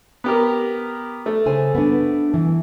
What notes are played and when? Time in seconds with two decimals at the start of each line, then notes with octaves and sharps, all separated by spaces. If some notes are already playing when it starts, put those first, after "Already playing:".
0.24 B3 G4 A#4
1.26 A3
1.46 C#3 C5 G#5
1.75 B3 D4
2.34 E3